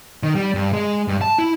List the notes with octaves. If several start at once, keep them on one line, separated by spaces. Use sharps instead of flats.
D#3
G3
G2
G#3
G2
A5
E4